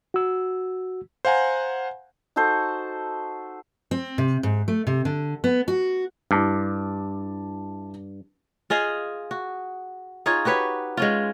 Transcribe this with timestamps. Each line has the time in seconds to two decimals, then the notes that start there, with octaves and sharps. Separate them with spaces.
0.14 F#4 E6
1.25 C5 F5 F#5 G#5 A#5
2.36 D#4 F#4 A4 C5
3.91 C4
4.18 C3
4.43 G#2
4.68 A3
4.87 C3
5.05 D3
5.44 B3
5.68 F#4
6.31 G2 E4 A5 D6
8.70 F4 G#4 D#5 F5
9.31 F#4
10.26 D#4 F4 G#4 C#5
10.45 F#4 G4 B4 C#5
10.97 G#3 C#4 F4